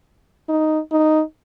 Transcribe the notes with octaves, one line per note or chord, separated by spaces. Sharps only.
D#4
D#4